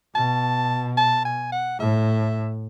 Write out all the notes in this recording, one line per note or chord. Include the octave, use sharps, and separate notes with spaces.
B2 A5
A5
G#5
F#5
A2 E5